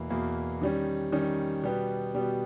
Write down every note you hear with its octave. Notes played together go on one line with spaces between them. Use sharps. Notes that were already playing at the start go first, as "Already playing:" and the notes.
Already playing: E2 B2 A#3 E4
E2 B2 A#3 E4
D#3 G3 C#4
D#3 G3 C#4
B2 G3 B3 G4
B2 G3 B3 G4